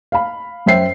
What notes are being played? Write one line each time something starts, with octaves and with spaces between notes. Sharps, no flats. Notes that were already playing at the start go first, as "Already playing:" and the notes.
F5 B5
F#2 C5 E5 G5 C7